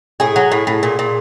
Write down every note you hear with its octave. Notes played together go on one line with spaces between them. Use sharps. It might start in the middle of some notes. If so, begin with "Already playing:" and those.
A2 G#4
F#3
A2
A2
A#2
A#2